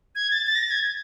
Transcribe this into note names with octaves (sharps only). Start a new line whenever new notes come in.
G#6
A6
A6
A#6
A6
G#6